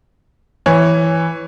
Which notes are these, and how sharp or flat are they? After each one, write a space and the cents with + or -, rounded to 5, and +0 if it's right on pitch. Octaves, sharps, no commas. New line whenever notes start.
E3 +0 C#5 +0